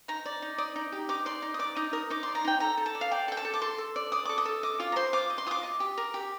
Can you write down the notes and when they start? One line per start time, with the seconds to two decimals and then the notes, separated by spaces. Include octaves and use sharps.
0.08 D#4 A#5
0.26 D5
0.42 D#4
0.58 D5 D#6
0.76 D#4
0.92 G4
1.09 D#4 D6
1.26 D5 C6
1.42 D#4
1.54 D#6
1.59 D5 D6
1.76 D#4 D#6
1.93 A#4 D#6
2.10 D#4 D6
2.23 D5 C6
2.35 A#5
2.45 D#4 G5
2.60 A4 A#5
2.77 A4
2.86 A5
2.95 D5
3.01 F5
3.11 D5 G5
3.28 A4 G5
3.37 A5
3.45 A4
3.53 D6
3.62 A4 C6
3.78 A4
3.96 D5
4.12 D5 D#6
4.25 A4 D6
4.38 D#6
4.45 A4
4.63 D#5 D6
4.80 F4 D6
4.92 A#5
4.96 C5 C6
5.13 F4 D6
5.30 D#5
5.38 C6
5.46 F4 D#6
5.51 D6
5.63 D#5
5.80 G4
5.98 A#4
6.14 G4